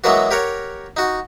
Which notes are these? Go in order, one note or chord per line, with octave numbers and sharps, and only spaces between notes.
E3 F#3 G#3 A#3 B3 F#4
G4 A#4 C#5 F#5
D#4 F#4